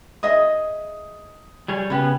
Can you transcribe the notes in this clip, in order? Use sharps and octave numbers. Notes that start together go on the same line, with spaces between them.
G#4 D#5 E5 D#6
G3 G#4 C#5
C#3 B3 C#4 G4 B5